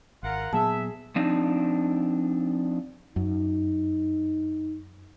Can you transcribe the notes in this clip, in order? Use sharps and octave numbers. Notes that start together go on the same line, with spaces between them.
G#1 F4 A#4 F#5
A#2 F#3 B3 G#4 E5 A5
F3 C4 D4 D#4
F#2 D#4